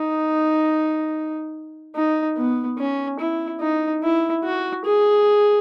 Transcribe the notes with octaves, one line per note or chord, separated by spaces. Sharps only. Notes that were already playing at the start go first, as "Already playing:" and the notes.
Already playing: D#4
D#4
B3
C#4
E4
D#4
E4
F#4
G#4